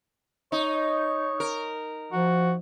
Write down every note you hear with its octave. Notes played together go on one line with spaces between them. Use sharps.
D#4 C#5
A#4
F3 F#4